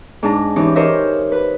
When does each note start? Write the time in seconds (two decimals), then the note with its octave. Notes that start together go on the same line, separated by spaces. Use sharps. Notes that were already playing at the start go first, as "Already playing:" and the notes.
0.23 G#2 D4 A#5
0.56 E3 C#4 D#4 G4
0.76 G4 A#4 C5 C#5 D#5 E5
1.32 B4